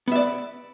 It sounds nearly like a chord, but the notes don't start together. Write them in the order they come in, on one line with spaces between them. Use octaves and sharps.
B3 E5 D5